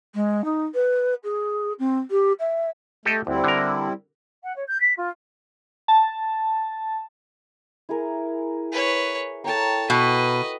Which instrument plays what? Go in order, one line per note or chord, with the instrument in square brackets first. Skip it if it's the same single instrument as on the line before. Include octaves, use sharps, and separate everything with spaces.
[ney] G#3
D#4
B4
G#4
C4
G4
E5
[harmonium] A3 [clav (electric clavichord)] G4 A4 D#5
[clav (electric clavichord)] D2 [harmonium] G3 C4 E4
[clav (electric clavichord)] D3 A#4
[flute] F#5
C#5
G6
B6
F4
[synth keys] A5
[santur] E4 G#4 A#4
[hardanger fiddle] B4 C#5
[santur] A4 G5 A#5 [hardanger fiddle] C#5 A5
[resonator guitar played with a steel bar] B2 [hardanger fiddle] B4 D#5